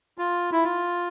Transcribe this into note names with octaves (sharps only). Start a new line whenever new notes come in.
F4
E4
F4